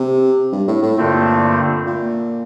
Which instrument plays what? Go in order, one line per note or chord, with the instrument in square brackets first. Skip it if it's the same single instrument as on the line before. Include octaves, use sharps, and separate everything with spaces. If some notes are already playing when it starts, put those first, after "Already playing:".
Already playing: [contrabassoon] C3
G2
A2
A2
[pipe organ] G2 D3 A3 C4 [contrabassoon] A#2
[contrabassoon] A#2